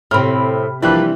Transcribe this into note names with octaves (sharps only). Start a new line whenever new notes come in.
A2 C3 C4 B5 F6
E3 F3 G3 A#3 C4 D4 B4 F#6